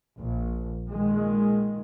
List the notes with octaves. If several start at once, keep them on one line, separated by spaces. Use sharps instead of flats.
A#1
A#2 D#3 G#3